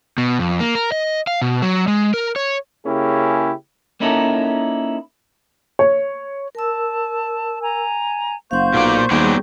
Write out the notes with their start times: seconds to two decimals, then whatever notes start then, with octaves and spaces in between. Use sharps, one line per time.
0.18 B2
0.39 F2
0.60 A#3
0.75 A#4
0.92 D#5
1.27 F5
1.42 B2
1.62 F#3
1.88 G#3
2.14 A#4
2.36 C#5
2.86 C#3 A#3 C#4 E4 G4 G#4
4.00 A#3 C#4 D#4 E4 A4 A#4
5.79 C#5
6.55 A#4 A5 E6
7.61 G#5 A#5
8.51 F#1 C5 F5 F#5 C#6 G6
8.74 B1 A#2 A#3 D5
9.11 D#2 F#3 G3 B3 G#4 D5